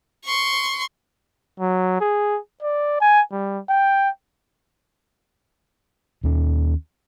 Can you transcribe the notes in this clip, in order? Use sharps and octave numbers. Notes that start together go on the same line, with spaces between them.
C6 C#6
F#3
G#4
D5
G#5
G3
G5
D#2 C#4